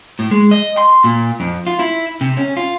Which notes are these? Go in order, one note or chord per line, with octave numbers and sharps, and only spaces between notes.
A2
G#3
D#5
C6
A#2
F2
F4
E4
C3
C#4
F4